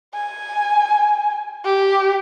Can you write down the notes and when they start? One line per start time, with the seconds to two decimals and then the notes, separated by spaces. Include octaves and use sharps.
0.14 G#5
1.64 G4